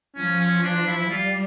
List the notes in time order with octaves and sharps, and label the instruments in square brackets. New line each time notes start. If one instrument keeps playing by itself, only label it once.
[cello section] F3 [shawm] C#4
[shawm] C#4
D4
E4
E4
[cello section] G3 [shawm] F4